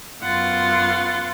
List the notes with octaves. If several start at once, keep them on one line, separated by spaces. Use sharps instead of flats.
F#2 B3 F4 F#5 C6 A6